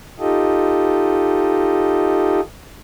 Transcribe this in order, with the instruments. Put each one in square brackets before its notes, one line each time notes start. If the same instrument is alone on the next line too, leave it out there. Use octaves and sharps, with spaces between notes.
[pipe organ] D#4 F4 G4 A4 D#5